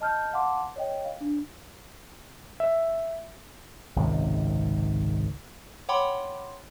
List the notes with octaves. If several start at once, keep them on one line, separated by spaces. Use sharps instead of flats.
D#5 A5 F6 G6
F5 F#5 A5 C6 D6
C#5 D#5 G5
F5
D4
E5
G#1 C#2 F#2 C3
C#5 F#5 G5 B5 C6 D6